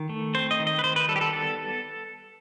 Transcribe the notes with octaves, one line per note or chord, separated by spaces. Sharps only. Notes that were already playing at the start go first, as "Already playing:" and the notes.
Already playing: D#3
A3
C4 C5
D#5
D#3
D#5
B4
D#3 C5
B4
G3 A4
G4
A4
B3 A4